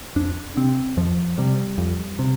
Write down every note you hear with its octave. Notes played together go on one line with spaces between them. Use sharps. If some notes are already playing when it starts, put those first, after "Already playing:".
F2 D4
C3 C4
F2 F3
C3 G3
F2
C3